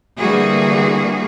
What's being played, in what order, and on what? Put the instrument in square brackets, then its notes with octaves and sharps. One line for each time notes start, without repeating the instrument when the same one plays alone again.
[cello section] D3 E3 G3 A#3 F#4 G#4